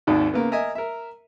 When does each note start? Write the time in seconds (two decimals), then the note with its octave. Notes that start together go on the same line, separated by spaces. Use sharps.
0.07 G#1 D#2 G#2 D#3 D5
0.34 C#3 A#3 B3
0.52 A#4 D#5 E5 G#5
0.75 A#4 E5